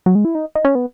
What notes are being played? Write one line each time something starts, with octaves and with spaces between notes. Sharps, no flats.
F#3
G#3
E4
D#4
D#4
C#4
B3